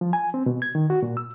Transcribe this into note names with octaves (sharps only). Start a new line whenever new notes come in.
F3
G#5
C4
B2
G#6
D#3
F#4
A#2
E6